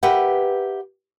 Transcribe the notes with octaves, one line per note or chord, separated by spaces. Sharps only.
G4 A#4 B4 E5 F#5 G5